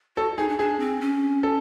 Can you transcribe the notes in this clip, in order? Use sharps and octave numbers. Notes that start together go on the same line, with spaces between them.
F#4 A4
D#4 G#4
D4
D4 G#4
C4
C#4
A4